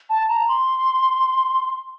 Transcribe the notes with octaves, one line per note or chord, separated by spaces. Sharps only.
A5
A#5
C6